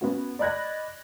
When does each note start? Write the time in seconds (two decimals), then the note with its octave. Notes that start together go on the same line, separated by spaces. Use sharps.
0.01 B3 C#4 F#4
0.39 D5 D#5 B5 F#6 G#6 A#6